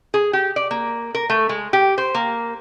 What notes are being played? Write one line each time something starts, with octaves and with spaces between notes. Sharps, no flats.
G#4
G4
D5
A#3
A#4
A3
G#3
G4
C5
A#3